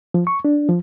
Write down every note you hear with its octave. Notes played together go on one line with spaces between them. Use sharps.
F3
C#6
D4
F3